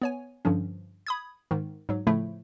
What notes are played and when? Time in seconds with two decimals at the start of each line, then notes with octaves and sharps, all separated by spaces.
0.02 B3 C#5 G#5
0.45 G2 D3 F3 C#4
1.07 B5 D#6 G#6
1.51 G#2 D#3
1.89 G#2 F#3
2.07 A2 C#3 F3 A3 E4